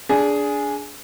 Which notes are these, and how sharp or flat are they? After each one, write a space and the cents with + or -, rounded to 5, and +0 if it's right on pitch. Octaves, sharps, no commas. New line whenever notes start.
D4 -15 G#4 +5